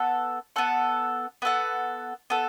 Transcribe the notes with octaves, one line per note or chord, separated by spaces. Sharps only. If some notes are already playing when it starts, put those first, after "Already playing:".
Already playing: B3 A4 F#5
B3 A4 F#5
B3 A4 F#5
B3 A4